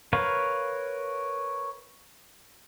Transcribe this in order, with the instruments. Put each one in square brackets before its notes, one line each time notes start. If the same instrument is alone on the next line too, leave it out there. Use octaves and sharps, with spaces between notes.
[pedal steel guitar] A#4 B4 C#5 F5